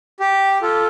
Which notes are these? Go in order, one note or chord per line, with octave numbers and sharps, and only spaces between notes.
G4
F4 A4